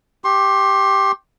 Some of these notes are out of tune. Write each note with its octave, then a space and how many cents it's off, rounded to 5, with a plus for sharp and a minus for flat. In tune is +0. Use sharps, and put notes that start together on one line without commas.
G4 +0 C6 +35